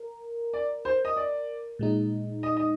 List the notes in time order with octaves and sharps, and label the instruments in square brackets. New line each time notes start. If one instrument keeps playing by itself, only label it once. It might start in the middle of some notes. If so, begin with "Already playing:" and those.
Already playing: [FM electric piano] A#4
[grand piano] D5
C5
D#5
D5
[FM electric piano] A#2 G#3 D#4
[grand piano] D#5
D#5